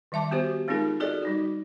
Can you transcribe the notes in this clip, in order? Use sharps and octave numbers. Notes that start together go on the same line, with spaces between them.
D#3 G3 E5 A5 D6
B3 F#4 G4 C5
G#3 C4 D#4 F4 G#4 A#4
F#4 G#4 A4 D5 D#5
G3 D#4 F#4